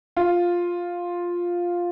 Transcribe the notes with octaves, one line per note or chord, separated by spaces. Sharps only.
F4